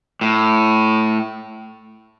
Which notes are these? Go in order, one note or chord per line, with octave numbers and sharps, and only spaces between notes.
A2